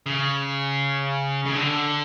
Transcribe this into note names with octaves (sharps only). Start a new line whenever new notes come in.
C#3
C#3
D3